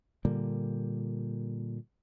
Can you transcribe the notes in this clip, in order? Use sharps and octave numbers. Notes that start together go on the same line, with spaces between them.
A#2 D3 G3 A#3